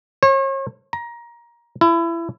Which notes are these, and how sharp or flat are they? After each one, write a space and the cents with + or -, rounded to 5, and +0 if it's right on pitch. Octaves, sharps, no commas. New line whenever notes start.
C#5 -40
A#5 +20
E4 +25